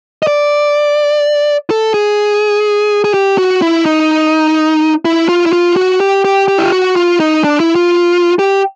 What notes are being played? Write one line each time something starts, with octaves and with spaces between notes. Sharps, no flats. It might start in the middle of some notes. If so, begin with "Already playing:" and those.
D#5
D5
A4
G#4
G#4
G4
F#4
E4
D#4
E4
F4
E4
F4
F#4
G4
G4
G4
E4
F4
F#4
F4
D#4
D4
E4
F4
G4